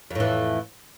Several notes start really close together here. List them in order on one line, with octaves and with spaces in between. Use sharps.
F2 A2 E3